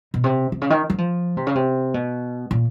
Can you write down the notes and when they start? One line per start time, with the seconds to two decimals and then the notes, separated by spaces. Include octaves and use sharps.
0.14 B2
0.24 C3
0.52 C3
0.62 C#3
0.70 D#3
0.90 F#3
0.98 F3
1.37 C3
1.47 C#3
1.55 C3
1.94 B2
2.51 A#2